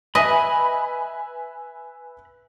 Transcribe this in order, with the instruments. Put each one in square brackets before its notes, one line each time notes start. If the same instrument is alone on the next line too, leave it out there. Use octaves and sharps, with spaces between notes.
[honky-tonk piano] B4 E5 G#5 [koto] D#5 [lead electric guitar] B5